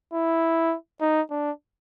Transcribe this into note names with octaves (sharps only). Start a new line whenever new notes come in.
E4
D#4
D4